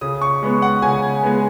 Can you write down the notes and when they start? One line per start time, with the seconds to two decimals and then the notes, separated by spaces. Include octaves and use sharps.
0.01 C#3 D#6
0.21 C#6
0.43 G#3 B3
0.62 F#5
0.82 C#3 G#5
1.23 G#3 B3